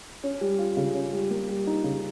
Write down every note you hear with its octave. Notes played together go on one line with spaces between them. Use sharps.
C#4
G3
F4
C#3
C#4
G3
A#3
G3
D#4
C#3